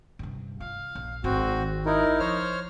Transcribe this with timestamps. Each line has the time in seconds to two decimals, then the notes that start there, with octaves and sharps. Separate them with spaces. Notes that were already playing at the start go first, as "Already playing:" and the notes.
0.19 G2 C3
0.60 F4 F5
0.95 A#1
1.24 G#1 D#3 C4 F#4
1.86 D#4 E4 A#4
2.20 F3 C5 C#5 F6